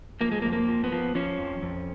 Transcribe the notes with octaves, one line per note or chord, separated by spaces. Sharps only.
F3 A#3
G#3
A#3
F2
A#3
F3
B3
F3
F3 C#4
F2
F2